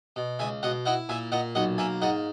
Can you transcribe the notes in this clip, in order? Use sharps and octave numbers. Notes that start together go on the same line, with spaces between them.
B2
C#2 E5 G#5
B2 D#5 F#5
E4 D#5 F#5
A#2 E5 G#5
A#2 D#5 F#5
B1 D#5 F#5
A#3 E5 G#5
G#2 D#5 F#5